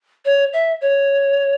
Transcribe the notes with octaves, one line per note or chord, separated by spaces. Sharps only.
C#5
E5
C#5